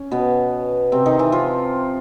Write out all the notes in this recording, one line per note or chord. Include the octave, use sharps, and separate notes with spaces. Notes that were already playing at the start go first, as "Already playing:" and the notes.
Already playing: C#4
B2 B3
C3 C4
D#3 D#4
E3 E4
F3 F4